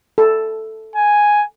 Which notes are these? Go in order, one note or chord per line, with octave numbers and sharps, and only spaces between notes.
A4
G#5